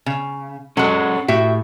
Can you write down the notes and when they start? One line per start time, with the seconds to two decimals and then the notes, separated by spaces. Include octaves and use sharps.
0.06 C#3
0.77 F#3 G#3 C#4 A4 F#5
1.28 A2 F#4 G4 E5